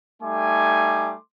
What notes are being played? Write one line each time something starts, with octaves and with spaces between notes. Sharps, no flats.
G3 A3 D#4 G#5 C6 D6